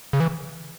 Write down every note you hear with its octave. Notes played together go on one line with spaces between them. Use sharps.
C#3
E3